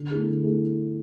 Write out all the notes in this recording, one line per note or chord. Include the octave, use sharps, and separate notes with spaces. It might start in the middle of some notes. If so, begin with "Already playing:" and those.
Already playing: D3
A3 E4 G#4
D3
A3 E4 G#4